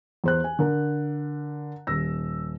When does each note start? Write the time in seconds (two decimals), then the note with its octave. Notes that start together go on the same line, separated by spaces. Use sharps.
0.24 E2 C5 F#6
0.44 G#5
0.59 D3 A#4
1.87 D#1 E6 A#6